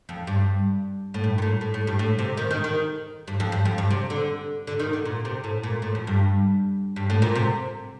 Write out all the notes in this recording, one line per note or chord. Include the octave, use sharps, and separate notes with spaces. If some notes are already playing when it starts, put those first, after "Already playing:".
F2
G2
A2
G2
A#2
A2
A2
A2
G2
A2
C3
D#3
D#3
D#3
G2
F2
G2
F2
G2
C3
D3
D3
D#3
D3
A#2
C3
A2
A#2
A2
F2
G2
G2
A2
A#2
C3